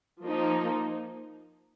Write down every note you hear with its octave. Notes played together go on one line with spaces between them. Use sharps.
F3 A#3 D#4